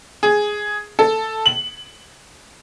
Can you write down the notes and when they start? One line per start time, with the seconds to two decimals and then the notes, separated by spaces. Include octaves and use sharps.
0.23 G#4
0.99 A4
1.46 F#7